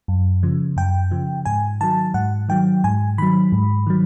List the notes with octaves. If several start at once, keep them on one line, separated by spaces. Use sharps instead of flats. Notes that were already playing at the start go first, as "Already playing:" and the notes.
F#2
C#3 F3
F#2 G5
C#3 F3
G#2 G#5
D#3 F#3 A5
G#2 F#5
D#3 F#3 G5
G#2 G#5
D#3 F#3 B5
G#2
D#3 F#3